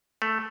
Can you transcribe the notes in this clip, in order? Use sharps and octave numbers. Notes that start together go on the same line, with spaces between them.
A3